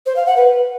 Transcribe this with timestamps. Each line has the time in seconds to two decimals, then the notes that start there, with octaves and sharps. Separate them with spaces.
0.06 C5
0.16 F5
0.26 F#5
0.36 B4